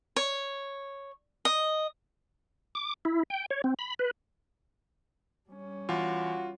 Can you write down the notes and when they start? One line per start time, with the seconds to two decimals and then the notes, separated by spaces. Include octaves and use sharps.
0.16 C#5
1.45 D#5
2.75 D6
3.05 E4
3.30 G5
3.50 C#5
3.64 C4
3.79 B5
3.99 B4
5.49 G3 C#4
5.89 E2 F4 F#4